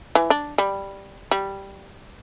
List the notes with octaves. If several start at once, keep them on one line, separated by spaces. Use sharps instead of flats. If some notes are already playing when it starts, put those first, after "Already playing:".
E3
D4
G3
G3